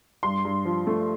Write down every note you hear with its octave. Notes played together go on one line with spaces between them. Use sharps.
G2 C6
G2
F3
A3